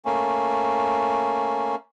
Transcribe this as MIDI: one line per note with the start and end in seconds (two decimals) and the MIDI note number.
0.05 1.75 57
0.05 1.75 58
0.05 1.75 61